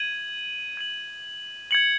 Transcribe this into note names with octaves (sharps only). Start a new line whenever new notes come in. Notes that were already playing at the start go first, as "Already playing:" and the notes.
Already playing: G#6 D#7 F#7
G#6 D#7 F#7
G#6 C#7 F#7